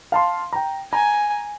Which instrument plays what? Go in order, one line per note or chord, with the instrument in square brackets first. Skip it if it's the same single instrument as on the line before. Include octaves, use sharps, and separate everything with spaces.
[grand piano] F5 A5 C6
G5 A#5
[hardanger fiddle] G#5 [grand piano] A#5